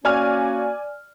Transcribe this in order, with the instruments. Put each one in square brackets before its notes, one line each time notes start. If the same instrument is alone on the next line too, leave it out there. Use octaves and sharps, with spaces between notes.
[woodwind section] A#3 C#4 F#4 [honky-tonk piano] D5 G#5 F6